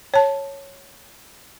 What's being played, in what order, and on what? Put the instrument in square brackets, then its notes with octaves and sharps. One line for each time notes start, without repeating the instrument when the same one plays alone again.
[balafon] C#5 A5